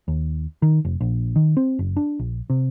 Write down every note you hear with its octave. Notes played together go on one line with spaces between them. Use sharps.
D#2
D#3
F1
A#1
D#3
C4
F#1
D4
A#1
C3